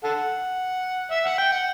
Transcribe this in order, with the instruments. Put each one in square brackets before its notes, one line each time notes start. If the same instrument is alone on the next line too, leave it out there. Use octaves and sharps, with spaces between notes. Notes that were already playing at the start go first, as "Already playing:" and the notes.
[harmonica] A4 F#5
E5
F#5
G5
F#5